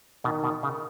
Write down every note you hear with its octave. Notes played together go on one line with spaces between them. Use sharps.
B2 D#3
B2
C#3